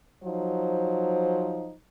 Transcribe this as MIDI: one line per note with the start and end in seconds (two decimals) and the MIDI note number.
0.24 1.73 53
0.24 1.73 54
0.24 1.73 63
0.24 1.73 72